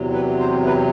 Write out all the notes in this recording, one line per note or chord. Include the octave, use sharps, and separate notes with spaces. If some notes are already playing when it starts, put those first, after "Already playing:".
Already playing: E2 C3 F#3
B4
C5
B4